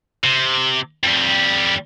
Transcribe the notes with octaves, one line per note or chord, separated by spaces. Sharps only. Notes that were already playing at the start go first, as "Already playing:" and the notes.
C3
F2 G3